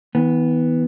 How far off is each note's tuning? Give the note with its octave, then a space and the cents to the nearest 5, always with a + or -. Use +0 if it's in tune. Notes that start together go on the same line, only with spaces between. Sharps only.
E3 -45 B3 +0